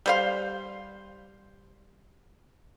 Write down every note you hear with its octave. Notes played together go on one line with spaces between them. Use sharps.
G3 C5 F5